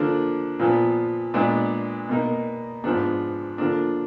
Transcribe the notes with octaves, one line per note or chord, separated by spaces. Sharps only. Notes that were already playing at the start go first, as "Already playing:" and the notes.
Already playing: D3 F3 A#3 D4
A#2 F3 B3
A#2 G#3 B3 D4
B2 A#3 D#4
G#2 F3 B3 D4
D3 F3 A#3 D4